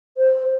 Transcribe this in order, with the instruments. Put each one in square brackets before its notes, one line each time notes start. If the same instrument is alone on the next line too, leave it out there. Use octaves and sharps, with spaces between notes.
[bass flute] C5